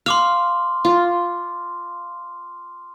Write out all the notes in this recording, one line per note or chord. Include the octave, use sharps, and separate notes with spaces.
F5 C6 D6 F6
F4